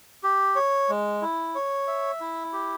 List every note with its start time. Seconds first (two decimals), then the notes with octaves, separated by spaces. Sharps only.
0.24 G4
0.56 C#5
0.89 G#3
1.22 E4
1.55 C#5
1.87 E5
2.21 E4
2.53 G4